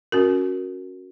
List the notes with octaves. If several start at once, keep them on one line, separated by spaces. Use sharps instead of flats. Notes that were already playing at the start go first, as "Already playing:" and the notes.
C#4 F#4 A#4